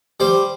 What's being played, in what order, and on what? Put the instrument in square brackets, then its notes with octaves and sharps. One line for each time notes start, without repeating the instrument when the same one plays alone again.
[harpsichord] G3 C5